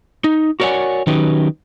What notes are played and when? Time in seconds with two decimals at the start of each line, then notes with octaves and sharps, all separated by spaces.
0.24 D#4
0.60 F#4 A#4 C#5 D5 F#5 G#5
1.07 D#3 F#3 C#4 D#4 G4 B4